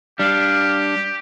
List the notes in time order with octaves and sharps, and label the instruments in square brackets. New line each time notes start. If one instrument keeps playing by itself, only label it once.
[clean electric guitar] G3 [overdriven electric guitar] D4 [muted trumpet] G4 [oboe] F5